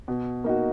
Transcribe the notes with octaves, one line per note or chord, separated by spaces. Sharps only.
B2
A#3 D#4 F#4